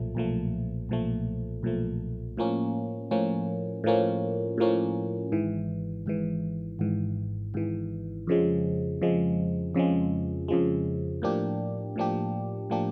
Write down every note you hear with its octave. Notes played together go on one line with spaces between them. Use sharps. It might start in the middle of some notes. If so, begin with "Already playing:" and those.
Already playing: B1 A#2 F3 A3
B1 A#2 F3 A3
B1 A#2 F3 A3
B1 A#2 F3 A3
A2 F3 A#3 C#4
A2 F3 A#3 C#4
A2 F3 A#3 C#4
A2 F3 A#3 C#4
G#1 G#2 E3
G#1 G#2 E3
G#1 G#2 E3
G#1 G#2 E3
F2 C#3 F3 G#3
F2 C#3 F3 G#3
F2 C#3 F3 G#3
F2 C#3 F3 G#3
A2 F3 A#3 D4 G4
A2 F3 A#3 D4 G4
A2 F3 A#3 D4 G4